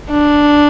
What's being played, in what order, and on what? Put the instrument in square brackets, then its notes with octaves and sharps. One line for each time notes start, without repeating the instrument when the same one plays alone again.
[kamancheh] D4